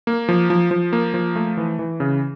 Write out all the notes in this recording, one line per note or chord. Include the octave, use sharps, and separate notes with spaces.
A#3
F3
F3
F3
A#3
F3
A3
E3
E3
C#3